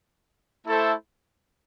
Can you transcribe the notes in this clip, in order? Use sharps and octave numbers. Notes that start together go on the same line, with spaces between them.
A3 E4 A4 C5 E5